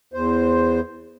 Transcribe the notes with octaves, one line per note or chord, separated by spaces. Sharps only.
E2 C5